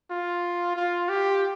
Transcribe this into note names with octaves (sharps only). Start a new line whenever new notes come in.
F4
F4
G4